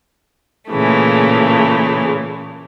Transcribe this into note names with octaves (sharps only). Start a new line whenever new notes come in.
A#2 C#3 E3 A3